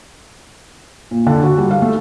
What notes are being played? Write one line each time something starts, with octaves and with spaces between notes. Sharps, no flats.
A#2
D3
F#4
G3
F5
A3